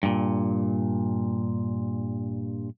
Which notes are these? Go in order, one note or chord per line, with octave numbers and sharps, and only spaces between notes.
G2 A#2